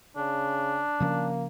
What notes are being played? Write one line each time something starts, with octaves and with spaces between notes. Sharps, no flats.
C#3 D4
C#3 F3 A#3 C#4